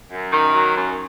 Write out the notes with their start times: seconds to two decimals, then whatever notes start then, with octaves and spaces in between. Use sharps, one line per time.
0.11 F#2
0.32 D#3
0.54 F#3
0.76 F#2